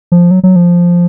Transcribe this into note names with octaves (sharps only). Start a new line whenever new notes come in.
F3
F#3
F#3
F3